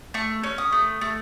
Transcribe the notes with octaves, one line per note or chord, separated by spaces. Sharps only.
A3 C#6
C#4
D#6
A3
A3